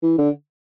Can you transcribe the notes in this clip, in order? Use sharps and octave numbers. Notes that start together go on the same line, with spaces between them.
E3
D3